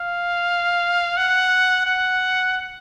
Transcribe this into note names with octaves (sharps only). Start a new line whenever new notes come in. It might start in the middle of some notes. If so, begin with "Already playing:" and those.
Already playing: F5
F#5
F#5